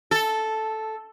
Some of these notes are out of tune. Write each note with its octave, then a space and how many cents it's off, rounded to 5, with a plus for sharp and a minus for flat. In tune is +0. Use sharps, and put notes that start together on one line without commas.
A4 -5